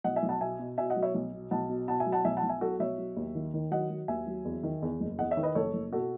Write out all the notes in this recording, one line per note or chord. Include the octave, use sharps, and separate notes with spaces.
B1 D#5 F#5
E5 G#5
B1
F#5 A5
B2 E5 G#5
B2
B2 E5 G#5
D#5 F#5
F#3
C#5 E5
B1
B2
B1 F#5 A5
B2
B2 F#5 A5
E5 G#5
F#3
F#5 A5
B1 E5 G#5
F#5 A5
B1
E5 G#5
F#3 F#4 A4
B1 C#5 E5
F#3
D#2
D#3
D#3
F#3 D#5 F#5
F#3
D#2 E5 G#5
F#3
E2
D#3
E2
F#1
E2 D#5 F#5
C#5 E5
D#3
B4 D#5
F#1 A4 C#5
F#1
B2 F#4 A4